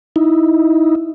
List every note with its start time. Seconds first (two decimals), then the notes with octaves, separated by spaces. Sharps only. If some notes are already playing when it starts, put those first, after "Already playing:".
0.16 D#4 E4